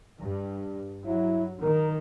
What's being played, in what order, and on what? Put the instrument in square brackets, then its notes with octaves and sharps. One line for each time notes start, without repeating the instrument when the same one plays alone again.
[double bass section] G2
[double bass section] F#3 [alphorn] E4
[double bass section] D#3 [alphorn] A#4